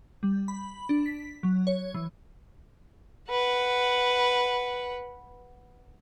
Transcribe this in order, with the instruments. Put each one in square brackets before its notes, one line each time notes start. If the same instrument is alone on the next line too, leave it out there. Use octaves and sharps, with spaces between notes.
[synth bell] G3
B5
D4
B6
F#3
C#5
E3
[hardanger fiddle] B4 F#5